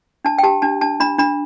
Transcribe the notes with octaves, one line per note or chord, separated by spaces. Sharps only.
D4 A5
G5
G4 A5
D4 A5
D4 A5
D4 B5
D4 B5